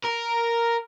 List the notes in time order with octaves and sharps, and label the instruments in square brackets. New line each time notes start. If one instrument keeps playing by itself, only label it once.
[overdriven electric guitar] A#4